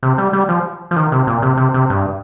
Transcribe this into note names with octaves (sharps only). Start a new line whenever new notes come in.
C3
G3
G3
F3
F3
D#3
C3
A#2
C3
C3
C3
G2